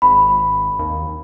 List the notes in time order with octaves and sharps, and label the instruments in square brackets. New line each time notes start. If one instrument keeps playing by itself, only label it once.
[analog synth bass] G#1 [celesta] B5
[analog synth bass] D#2